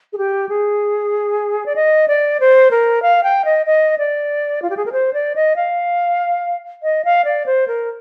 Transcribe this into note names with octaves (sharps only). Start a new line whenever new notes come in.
G#4
G4
G#4
D5
D#5
D5
C5
A#4
F5
G5
D#5
D#5
D5
F4
G4
G#4
A#4
C5
D5
D#5
F5
D#5
F5
D5
C5
A#4